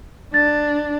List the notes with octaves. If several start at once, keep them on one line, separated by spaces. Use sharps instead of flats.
D4 A6